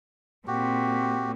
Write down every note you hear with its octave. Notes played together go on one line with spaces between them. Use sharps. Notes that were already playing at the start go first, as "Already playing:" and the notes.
A#2 C4 F#4 G4